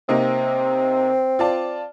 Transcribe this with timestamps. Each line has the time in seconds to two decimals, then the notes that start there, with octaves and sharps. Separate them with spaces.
0.09 C3 A#3 C4 D#4
1.39 F4 D5 A5